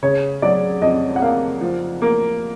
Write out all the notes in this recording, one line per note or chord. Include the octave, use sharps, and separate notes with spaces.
C#3 C#5
F#3 D5
F2 D#5
F#5
A#3 F5
F3
A#3